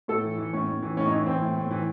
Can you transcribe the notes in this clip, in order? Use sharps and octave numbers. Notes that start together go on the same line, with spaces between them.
A2 A4
E3
E3
A2 C#4
A2
E3
A2 C#4
D#4
E3 C#4
E3 C4
A2
A2
E3